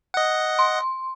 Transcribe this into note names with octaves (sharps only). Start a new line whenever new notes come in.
D#5 F#5
C6